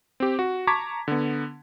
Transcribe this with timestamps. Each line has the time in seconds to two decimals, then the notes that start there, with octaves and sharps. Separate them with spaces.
0.20 C4 G4
0.39 F#4
0.67 A5 A#5 C#6 D6 G#6 B6
1.08 D3 B3